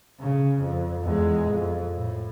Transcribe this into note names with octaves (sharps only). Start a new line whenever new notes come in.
C#3
F2
E2 G#3
F2
A2